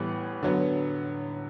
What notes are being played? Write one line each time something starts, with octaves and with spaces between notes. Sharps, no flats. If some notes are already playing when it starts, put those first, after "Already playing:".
Already playing: A2 E3 G3 B3
D3 F#3 B3